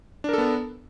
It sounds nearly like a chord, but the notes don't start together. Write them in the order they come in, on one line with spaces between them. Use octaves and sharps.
D4 A#4 A4 B3